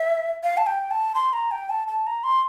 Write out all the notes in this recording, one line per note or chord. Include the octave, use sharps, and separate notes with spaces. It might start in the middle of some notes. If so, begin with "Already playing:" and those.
Already playing: E5
F5
A5
G5
A5
C6
A#5
G5
A5
A5
A#5
C6